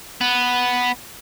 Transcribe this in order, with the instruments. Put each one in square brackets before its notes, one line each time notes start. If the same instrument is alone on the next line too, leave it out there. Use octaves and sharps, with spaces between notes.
[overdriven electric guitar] B3